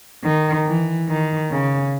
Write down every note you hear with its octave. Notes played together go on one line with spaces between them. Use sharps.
D#3
E3
D#3
C#3